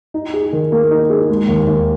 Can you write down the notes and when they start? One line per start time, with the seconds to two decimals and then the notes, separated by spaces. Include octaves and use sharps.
0.14 D#4
0.34 G#4
0.53 D#3
0.72 A#3
0.91 D#4
1.10 G#4
1.29 G#3
1.48 D#2
1.67 D#2